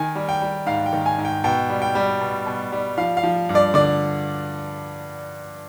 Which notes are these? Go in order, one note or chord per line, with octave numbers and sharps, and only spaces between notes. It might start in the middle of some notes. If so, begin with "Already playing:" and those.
Already playing: D#3 G#5
G3
G5
G3
G#2 F5
G5
D#3
G#5
G#2
G5
B2 G5
G3
G5
G3
B2
B2
G3
F3 F5
F5
F3
G2
D5
D3 D5